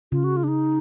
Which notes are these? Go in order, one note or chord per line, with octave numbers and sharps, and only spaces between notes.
C#3 F4
F#4
F4
D4
D#4